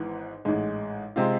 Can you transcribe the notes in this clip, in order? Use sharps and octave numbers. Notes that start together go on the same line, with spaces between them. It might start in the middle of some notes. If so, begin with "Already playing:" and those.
Already playing: G#1 G#2 E3 B3
A1 G#2 G#3
C3 G#3 C4 F4